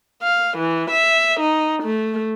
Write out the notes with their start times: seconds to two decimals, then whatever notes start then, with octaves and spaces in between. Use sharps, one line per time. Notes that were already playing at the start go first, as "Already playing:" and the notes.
0.23 F5
0.58 E3
0.90 E5
1.40 D#4
1.83 A3